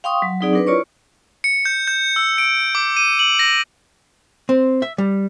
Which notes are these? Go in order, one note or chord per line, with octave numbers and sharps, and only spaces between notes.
F5 G5 C6 C#6 D#6
F#3
F#3 C4 D#4 G#4 D5
D4 A#4 B4
E4 F4 C#5 D5 C#6
C#7
G6
G6
E6
D7
D6
D#7
F#7
A#6
C4
E5
G3